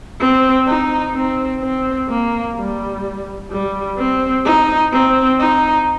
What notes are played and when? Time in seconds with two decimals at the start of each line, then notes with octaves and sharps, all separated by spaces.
0.20 C4
0.67 D#4
1.14 C4
1.62 C4
2.09 A#3
2.56 G3
3.51 G3
3.98 C4
4.46 D#4
4.93 C4
5.39 D#4